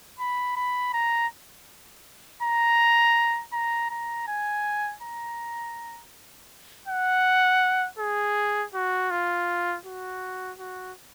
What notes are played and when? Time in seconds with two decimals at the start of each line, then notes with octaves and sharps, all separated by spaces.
0.20 B5
0.56 B5
0.94 A#5
2.42 A#5
3.53 A#5
3.90 A#5
4.28 G#5
5.03 A#5
6.88 F#5
7.99 G#4
8.74 F#4
9.11 F4
9.86 F#4
10.59 F#4